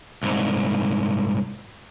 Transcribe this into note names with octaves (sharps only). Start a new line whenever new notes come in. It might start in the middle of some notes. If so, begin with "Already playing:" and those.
C2 G#2